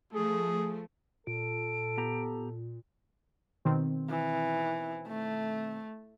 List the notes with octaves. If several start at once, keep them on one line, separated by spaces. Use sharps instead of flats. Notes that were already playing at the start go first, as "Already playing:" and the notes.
F3 A3 G#4
A#2 A4 D7
B3 G4 A#5
B2 D#3 C4
E3
A3